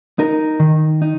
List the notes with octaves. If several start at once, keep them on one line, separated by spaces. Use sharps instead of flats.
D#4 A#4
D#3
D#4